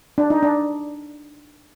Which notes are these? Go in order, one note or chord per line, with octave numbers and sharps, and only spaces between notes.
D4
D#4
D4